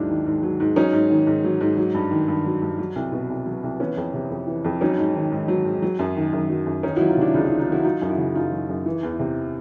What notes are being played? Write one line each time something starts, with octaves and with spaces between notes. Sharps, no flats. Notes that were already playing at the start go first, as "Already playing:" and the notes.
Already playing: D#2 G#2 F#3 D4 E4
D#3
G#2
F#3
G#2
F#3 C#4 D#4
G#2
D#3
G#2
F#3
G#2
F#3
G2
D#3
G2
F#3
G2
F#3
C2
B2
C2
F#3
C2
E3 B3 C#4
F2
C3
F2
E3
F2
F#3 C#4 D#4
G#2
D#3
G#2
F#3
G#2
F#3
F#2
D#3
F#2
F#3
F#2
D#3 C#4 D#4
F#3 E4 F#4
D#4 F4
C3 D4 E4
C#2 D#4 F4
D#4 F4
D#3
D#4 F4
F#3 E4 F#4
F#3 D#4 F4
F#2
E4 F#4
C#3
F#2 D#4 F4
F#3
F#2
E3
E2
C3